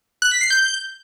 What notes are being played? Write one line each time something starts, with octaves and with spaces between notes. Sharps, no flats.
F#6
B6
C7
G6